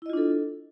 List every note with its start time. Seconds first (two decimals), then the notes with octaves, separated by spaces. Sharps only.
0.02 E4
0.06 D#5
0.10 F4
0.13 D4
0.17 A4